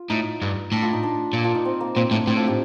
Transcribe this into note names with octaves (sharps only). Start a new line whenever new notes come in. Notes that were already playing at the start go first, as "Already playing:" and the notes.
Already playing: F4
A2 D#4
G2
A2 D4
D4 F4
D#4
D4
A#2
D4 F4
D#4
C4
A#3
A#2 C4
A2 D4
A2 C4
D4 F4
D#4 G4